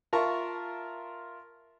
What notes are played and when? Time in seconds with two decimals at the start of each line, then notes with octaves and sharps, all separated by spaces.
0.13 F4 A#4 E5 A5 A#5 C#6